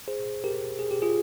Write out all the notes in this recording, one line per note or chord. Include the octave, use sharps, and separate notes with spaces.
G#4 C5
G4 A#4
G#4
G4
F4 G#4